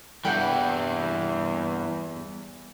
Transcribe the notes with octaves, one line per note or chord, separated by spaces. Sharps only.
E2 G2 E3 G3 B3 F#5 G5